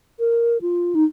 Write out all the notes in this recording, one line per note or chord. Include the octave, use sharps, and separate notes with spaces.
A#4
F4
D#4